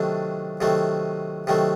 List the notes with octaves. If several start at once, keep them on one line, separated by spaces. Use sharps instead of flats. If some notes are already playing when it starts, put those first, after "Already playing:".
Already playing: C3 D#3 F#3 A3 D4
C3 D#3 F#3 A3
C3 D#3 F#3 A3